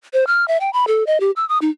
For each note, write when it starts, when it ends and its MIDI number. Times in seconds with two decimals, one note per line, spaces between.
0.13 0.27 72
0.27 0.47 89
0.48 0.58 76
0.60 0.72 79
0.73 0.85 83
0.87 1.06 69
1.07 1.20 75
1.20 1.31 67
1.36 1.47 88
1.49 1.58 87
1.62 1.70 63